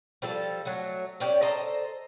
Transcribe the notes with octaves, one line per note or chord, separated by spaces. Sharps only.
F3 G3 A4
F#3 A3
C#4 G4 D5
A4 C5 D#5 A#5